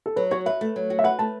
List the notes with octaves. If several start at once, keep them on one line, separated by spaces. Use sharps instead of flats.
A4
F#3 B4
F#4 C#5
B4 E5
A3
F#3
F#4
E5
B4 F#5
A3 A5